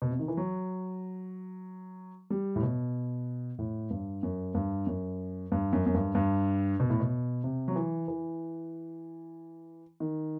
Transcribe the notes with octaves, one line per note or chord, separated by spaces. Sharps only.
B2
C3
D#3
E3
F#3
G3
A2
B2
A2
G2
F#2
G2
F#2
G2
F#2
F#2
G2
G2
B2
A2
B2
C3
F#3
E3
E3
D#3